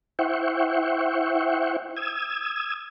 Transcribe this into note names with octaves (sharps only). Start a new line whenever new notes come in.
E4 C5 E5 F#5 G5 C#6
D#6 E6 G#6